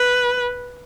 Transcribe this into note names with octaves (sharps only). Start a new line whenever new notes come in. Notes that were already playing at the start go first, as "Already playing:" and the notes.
Already playing: B4